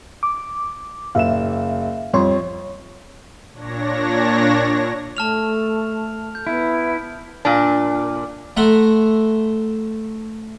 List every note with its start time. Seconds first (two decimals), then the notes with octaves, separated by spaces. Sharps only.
0.23 D6
1.15 F#1 E5 F5 E7
2.14 F2 G3 C#5 C6
3.53 A#2 D4 C#5 A#6
5.17 A3 A5 F6 F7
6.35 G6
6.47 B3 E4
7.45 A#2 D4
8.57 A3 E5 F#5 A#5 C6